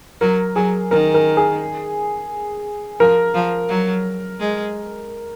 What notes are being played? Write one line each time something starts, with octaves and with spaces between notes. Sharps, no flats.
F#3 A#4
F#3 G#4
D#3 A#4
A#4
G#4
F3 A#4
F3
F#3
G#3